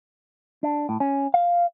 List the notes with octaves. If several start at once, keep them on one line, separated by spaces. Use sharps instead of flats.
D4
A2
C#4
F5